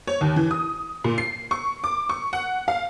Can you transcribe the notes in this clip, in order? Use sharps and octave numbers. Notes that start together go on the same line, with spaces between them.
C#5
D#2
E3
D#6
A#2
C7
C#6
D6
C#6
F#5
F5